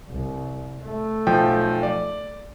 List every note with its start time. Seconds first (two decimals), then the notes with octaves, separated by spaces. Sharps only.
0.10 C2
0.84 A3
1.27 B1 F3 G5
1.83 D5